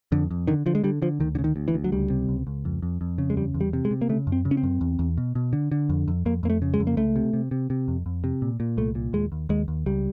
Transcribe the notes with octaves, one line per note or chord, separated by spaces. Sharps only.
F2 D3
F2
D3 D#3
D3 F3
G#3
D3 G3
D3 F3
D2 D#3
D3
C#3
D#3
D2
E3
D2
F#3
C#2 G3
C3
C#2
C#2
F2
F2
F2
C#3
G#3
E2 G3
E2
G3
C3
G#3
C3
A#3
C#3 A3
F#2
C4
C#3
C#4
C4
F#2
E2
E2
B2
B2
D3
D3
F2
F2
F2 A#3
F2 A#3
A3
C#3
G#3
F2
A#3
C#2 A3
C3
C3
C3
C3
F2
F2
C3
A#2
A#2
C2 A3
A#2
D#2 G#3
D#2
D#2 G#3
D#2
C#2 G3